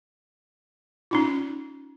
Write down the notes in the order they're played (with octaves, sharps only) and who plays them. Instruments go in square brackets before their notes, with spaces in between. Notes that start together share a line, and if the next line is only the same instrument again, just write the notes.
[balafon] C#4 D#4 F4